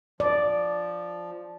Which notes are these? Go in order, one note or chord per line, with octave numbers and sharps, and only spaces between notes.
F3 D5